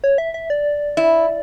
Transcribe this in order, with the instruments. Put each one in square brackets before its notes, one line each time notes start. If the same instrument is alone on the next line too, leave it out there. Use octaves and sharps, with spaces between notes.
[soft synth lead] C#5
E5
E5
D5
[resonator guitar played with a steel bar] E4